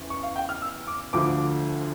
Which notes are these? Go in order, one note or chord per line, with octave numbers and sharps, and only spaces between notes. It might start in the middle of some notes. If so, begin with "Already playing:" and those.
Already playing: E2 C#3 E3
C#6
F5
G5
F6
E6
D6
D2 D3 F3 D6